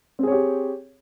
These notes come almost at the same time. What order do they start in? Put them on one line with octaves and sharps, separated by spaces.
C4 G#4 C#5 G4